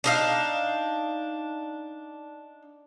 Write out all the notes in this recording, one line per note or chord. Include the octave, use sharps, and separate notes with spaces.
D4 D#4 F5